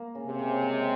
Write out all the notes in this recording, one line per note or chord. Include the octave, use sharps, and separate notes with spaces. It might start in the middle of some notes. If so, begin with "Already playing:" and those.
Already playing: A#3
C#3
C3
C#3
G#3